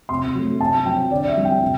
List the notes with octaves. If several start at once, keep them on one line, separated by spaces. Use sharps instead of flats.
C3 C6
F#3 A3
C3 A5
F#3 C4 G5
D3 D5
E5
G3 C4
G5
C3